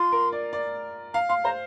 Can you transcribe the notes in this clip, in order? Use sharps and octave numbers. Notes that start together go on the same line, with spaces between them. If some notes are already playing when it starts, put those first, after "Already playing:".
Already playing: F4 C6
A#4
D5
D5
F5 A#5
F5 C6
C5 A#5